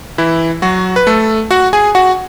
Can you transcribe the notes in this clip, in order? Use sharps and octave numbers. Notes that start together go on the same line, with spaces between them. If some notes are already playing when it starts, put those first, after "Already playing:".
E3 E4
F#3 F#4
B4
A3 A4
F#4 F#5
G#4 G#5
F#4 F#5